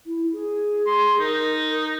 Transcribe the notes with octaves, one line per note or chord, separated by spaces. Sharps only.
E4
G#4
C6
D#4 A#4